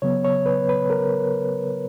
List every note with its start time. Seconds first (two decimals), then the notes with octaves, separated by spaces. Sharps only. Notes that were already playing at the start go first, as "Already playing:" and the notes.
0.02 C#3 F#3 B3 C#5
0.25 C#5
0.46 B4
0.69 B4
0.90 A#4